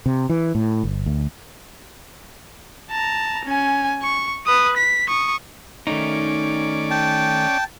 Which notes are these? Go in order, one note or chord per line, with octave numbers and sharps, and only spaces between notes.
C3
E3
A2
G1
D2
A5 A#5
C#4 G#5
C#6
B4 D#6
B6
C#6 D#6
D#3 A3 C#4 D#4 D5
G5 A5